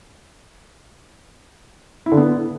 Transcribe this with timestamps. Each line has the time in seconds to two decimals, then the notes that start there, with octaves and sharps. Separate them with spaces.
2.06 E4
2.12 D3
2.17 B3